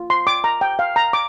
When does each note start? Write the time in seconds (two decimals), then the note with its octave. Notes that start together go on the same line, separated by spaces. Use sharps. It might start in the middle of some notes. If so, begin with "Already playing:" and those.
Already playing: F4
0.10 C6
0.27 D6
0.44 A#5
0.61 G5
0.79 F5
0.96 A#5
1.13 D6